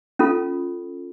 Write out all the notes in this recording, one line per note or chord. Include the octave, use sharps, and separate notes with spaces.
C#4 F4 A4